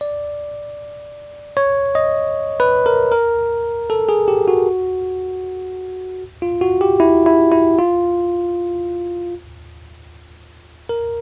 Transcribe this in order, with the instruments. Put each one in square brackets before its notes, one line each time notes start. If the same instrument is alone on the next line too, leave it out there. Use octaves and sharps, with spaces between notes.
[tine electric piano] D5
C#5
D#5
B4
A#4
A#4
A4
G#4
G4
F#4
F4
F#4
G4
E4
E4
E4
F4
A#4